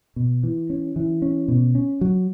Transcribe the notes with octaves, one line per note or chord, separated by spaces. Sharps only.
B2
E3
C#4
E3
C#4
B2
C#4
F#3